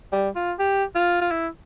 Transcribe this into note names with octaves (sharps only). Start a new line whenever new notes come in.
G3
F4
G4
F4
F4
E4